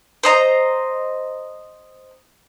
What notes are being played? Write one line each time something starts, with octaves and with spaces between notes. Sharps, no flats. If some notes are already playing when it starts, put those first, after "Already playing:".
C5 D#5 A#5